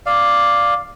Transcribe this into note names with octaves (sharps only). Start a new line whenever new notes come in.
D5 F5